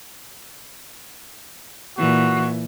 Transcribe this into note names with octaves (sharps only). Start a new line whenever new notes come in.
A#2 E3 F#4